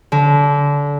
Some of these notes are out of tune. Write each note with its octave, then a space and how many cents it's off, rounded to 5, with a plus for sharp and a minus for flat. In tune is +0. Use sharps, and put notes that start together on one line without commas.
D3 -25